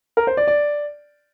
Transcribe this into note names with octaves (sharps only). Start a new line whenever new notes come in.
A#4
C5
D5
D5